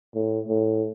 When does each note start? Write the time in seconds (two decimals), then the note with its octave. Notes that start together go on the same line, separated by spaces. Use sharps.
0.15 A2
0.48 A2